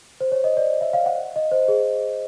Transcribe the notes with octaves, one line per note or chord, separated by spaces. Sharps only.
C5
C#5
D#5
D5
E5
F5
F#5
D#5
C5
G#4